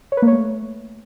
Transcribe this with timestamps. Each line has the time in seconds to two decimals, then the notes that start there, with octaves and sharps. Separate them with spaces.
0.12 C#5
0.17 B4
0.22 A#3
0.28 C#5
0.33 A3